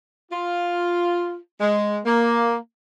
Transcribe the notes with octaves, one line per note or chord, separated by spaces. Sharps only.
F4
G#3
A#3